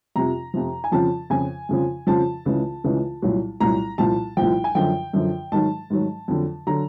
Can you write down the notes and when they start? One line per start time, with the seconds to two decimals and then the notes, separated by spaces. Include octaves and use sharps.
0.16 F2 C3 F3 A#5
0.54 F2 C3 F3
0.84 G#5
0.92 F2 C#3 F3 A5
1.30 F2 C#3 F3 G#5
1.69 F2 C#3 F3
2.07 F2 C#3 F3 A5
2.45 C#2 C#3 E3
2.84 C#2 C#3 E3
3.22 C2 A#2 F#3
3.60 C2 A#2 F#3 A#5
3.98 C2 A#2 F3 A5
4.37 C2 A#2 F3 G5
4.64 G#5
4.75 F#2 D3 F3 G5
5.13 F#2 D3 F3
5.52 G#2 D#3 F#3 A5
5.90 G#2 D#3 F#3
6.28 F2 D3 F#3
6.67 D3 F#3 A#5